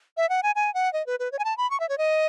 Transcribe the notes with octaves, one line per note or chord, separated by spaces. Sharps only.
E5
F#5
G#5
G#5
F#5
D#5
B4
B4
C#5
G#5
A5
B5
C#6
E5
C#5
D#5